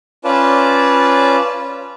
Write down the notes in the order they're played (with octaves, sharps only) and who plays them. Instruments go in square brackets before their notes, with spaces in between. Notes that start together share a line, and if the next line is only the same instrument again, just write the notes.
[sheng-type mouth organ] C#4 F4 B4 D5 A5